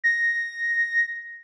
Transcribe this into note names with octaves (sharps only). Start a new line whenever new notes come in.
A#6